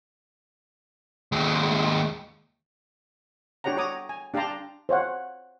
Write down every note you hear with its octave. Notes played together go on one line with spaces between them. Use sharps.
D#2 G#3
D4 F#4 G4 C#5 F#5 A#5
F#4 C#5 A#5 D6 D#6
G#5
D4 G4 F5 A5 A#5 C6
C5 C#5 F5 F#5